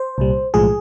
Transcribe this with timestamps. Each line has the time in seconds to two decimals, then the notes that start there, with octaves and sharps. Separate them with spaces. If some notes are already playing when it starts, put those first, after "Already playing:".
Already playing: C5
0.18 C2 A#2 G3
0.54 B1 A2 F3 G#3 G#4